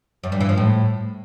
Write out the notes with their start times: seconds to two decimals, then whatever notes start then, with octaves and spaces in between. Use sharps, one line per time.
0.23 F#2
0.32 G2
0.40 E3
0.49 F3
0.57 A2